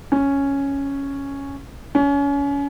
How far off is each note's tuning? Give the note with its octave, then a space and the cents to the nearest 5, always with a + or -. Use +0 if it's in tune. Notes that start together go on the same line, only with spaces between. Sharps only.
C#4 +0
C#4 +30